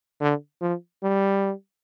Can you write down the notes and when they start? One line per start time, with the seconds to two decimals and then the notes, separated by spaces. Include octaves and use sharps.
0.21 D3
0.62 F3
1.03 G3